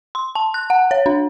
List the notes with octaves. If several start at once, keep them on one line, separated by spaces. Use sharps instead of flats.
C6
A5
F#6
F#5
C#5
D4